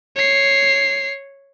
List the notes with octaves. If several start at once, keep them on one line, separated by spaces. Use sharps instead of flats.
C#5 C7